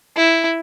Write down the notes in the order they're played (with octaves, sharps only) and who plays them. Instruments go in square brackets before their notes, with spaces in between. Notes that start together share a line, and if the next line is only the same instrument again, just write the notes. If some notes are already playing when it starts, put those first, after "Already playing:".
[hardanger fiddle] E4